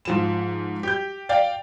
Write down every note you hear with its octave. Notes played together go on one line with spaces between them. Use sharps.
G#2 F3 E7
G4 G6
D5 F5 G5